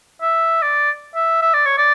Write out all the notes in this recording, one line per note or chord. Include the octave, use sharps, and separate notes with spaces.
E5
D5
E5
E5
D5
C#5
D5